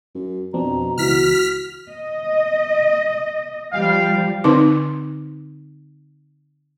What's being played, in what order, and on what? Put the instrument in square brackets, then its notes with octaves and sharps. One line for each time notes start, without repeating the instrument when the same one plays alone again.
[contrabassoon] F#2
[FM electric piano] F2 C4 D4 [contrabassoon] B2 [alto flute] A#5
[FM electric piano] C#2 E3 [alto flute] F#4 [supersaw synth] F6 B6
[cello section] D#5
[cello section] F3 G3 [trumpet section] F5 G5
[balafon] D3 C4 D#4 D6